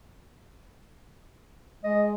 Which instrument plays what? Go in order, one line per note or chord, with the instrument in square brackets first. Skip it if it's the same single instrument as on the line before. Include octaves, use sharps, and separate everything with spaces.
[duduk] G#3 [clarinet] D#5